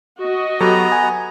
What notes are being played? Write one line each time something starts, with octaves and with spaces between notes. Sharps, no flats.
F#4 D#5
F#3 B3 G4 A4 A#5
G#5